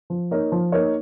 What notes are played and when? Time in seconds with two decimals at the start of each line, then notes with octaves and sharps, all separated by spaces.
0.10 F3
0.31 A#3 D#4 A#4 C#5
0.52 F3
0.72 A#3 D#4 A#4 C#5